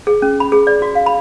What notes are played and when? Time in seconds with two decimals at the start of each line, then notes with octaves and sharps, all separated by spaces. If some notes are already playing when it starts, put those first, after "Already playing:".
0.07 G#4
0.22 C#4
0.40 B5
0.52 G#4
0.67 D5
0.82 F#4
0.95 F5
1.06 B5